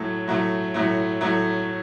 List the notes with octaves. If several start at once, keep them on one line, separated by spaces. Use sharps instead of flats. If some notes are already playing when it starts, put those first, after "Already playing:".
Already playing: A2 F#3 A3
A2 F#3 A3
A2 F#3 A3
A2 F#3 A3